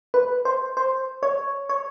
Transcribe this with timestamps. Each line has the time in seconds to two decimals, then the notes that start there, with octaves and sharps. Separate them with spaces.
0.14 B4
0.45 C5
0.77 C5
1.23 C#5
1.69 C#5